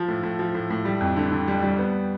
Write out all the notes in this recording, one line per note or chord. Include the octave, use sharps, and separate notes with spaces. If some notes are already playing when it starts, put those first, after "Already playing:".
Already playing: F3
A2
A2
F3
A2
A2
G3
F2
D3
D3
G3
G3
B3